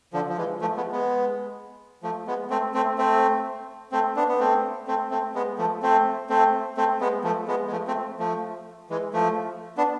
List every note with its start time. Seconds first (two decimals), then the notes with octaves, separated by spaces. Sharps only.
0.13 D3 F3
0.29 F3
0.37 E3 G#3
0.61 F3 A3
0.77 G#3 B3
0.92 G#3 B3
2.03 F3 A3
2.27 G#3 B3
2.50 A3 C4
2.74 A3 C4
2.98 A3 C4
3.92 A3 C4
4.16 B3 D4
4.28 B3
4.39 A3 C4
4.87 A3 C4
5.11 A3 C4
5.35 G#3 B3
5.58 F3 A3
5.83 A3 C4
6.29 A3 C4
6.77 A3 C4
7.01 G#3 B3
7.24 F3 A3
7.48 G#3 B3
7.68 G#3
7.72 F3 A3
7.87 A3 C4
8.19 F3 A3
8.90 E3 G#3
9.13 F3 A3
9.77 B3 D4